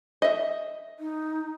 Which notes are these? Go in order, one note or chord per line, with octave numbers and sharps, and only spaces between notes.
D#5 E5
D#4